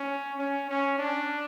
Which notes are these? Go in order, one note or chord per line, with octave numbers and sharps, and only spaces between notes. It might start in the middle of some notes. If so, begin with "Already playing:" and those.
Already playing: C#4
C#4
C#4
D4